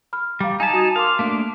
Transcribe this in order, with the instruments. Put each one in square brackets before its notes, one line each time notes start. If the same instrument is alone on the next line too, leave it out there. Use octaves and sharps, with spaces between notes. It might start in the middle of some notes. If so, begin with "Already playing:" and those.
[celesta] B5 F6
[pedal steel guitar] G3 [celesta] F5 A#5 D6
[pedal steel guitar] D#4 A5 [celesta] G#5 G#6 B6
[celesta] F#4 D#6 G#6
[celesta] A#4 C6 D6 [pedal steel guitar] F5
[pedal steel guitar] A3 A#3 D4